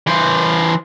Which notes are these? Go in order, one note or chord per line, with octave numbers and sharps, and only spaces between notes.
E3 C5